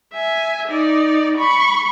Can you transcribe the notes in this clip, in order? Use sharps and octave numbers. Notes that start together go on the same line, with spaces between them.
E5 G#5
D#4 D5
B5 C#6